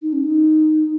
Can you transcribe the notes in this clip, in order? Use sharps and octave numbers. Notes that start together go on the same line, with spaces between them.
D#4
C#4
D#4